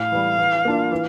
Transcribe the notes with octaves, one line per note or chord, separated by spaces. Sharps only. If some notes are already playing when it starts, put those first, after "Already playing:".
Already playing: A2 F5
E3 G3
E3
A#3 D4 F4
E3